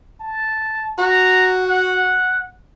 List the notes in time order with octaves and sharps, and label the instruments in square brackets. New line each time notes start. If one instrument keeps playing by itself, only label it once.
[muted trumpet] A5
[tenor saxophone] F#4 [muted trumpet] A#5
[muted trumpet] F#5